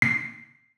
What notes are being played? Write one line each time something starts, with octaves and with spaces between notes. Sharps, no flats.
C7